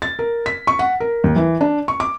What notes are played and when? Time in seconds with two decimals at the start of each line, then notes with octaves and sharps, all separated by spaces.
0.02 A6
0.19 A#4
0.46 B6
0.67 C#6
0.79 F#5
1.00 A#4
1.24 D#2
1.36 E3
1.61 D4
1.88 C#6
2.00 D6